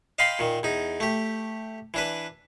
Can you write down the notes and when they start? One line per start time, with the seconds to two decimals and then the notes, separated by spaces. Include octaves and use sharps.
0.19 D#5 F5 G5 B5 C6
0.39 A#2 D#3
0.63 E2 D#4
1.00 A3 G4
1.94 E3 D4 B4